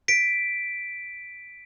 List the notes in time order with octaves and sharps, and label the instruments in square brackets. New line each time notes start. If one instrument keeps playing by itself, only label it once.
[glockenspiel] B6 D7